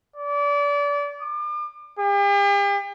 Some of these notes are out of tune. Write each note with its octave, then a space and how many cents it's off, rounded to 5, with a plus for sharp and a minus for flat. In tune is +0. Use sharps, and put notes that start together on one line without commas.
D5 -30
D6 +40
G4 +45